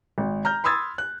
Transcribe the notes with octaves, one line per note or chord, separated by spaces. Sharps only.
G#1
A#5 F6 G6
B5 C6 D#6 E6 G#6 A6
F#6